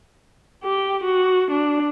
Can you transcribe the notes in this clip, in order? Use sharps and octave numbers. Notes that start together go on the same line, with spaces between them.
G4
F#4
D4